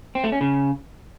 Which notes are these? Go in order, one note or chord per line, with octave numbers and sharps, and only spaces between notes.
C4
A3
C#4
C#3